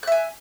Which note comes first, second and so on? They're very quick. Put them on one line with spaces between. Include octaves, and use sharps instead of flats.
F#6 E5 G#5